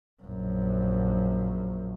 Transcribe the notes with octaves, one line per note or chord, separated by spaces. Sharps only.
A#1 F#2